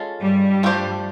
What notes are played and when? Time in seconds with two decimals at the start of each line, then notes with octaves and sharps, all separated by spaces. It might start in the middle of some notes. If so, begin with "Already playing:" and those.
Already playing: G#3 C#4 F4 A4
0.20 G2 G3
0.63 F3 A3 D4 G4 C5